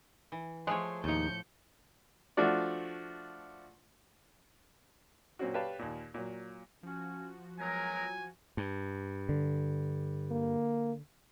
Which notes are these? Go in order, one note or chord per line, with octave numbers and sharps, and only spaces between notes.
E3
F3 G#3 A3 C5 C#5
D#2 A2 F3 D#4 G6 C#7
F3 A3 D4 F#4 D5
A#2 F#3 C4 C#4 F#4
G4 B4 C#5 D5 F5 A5
D#2 A#2
A#2 F#3
F3 C#4 F#4
F#3 G#3 B3 A#4 G#5
G2
D3
A#3